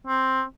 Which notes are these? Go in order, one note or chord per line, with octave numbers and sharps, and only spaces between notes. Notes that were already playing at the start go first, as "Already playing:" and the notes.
C4